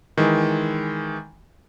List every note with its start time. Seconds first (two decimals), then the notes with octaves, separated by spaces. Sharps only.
0.17 D#3 E3 G#3